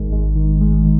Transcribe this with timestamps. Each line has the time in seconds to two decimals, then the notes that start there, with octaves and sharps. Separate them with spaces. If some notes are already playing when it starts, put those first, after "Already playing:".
Already playing: G#1 D#3 G#3
0.12 G#3
0.36 D#3
0.61 G#3
0.84 D#3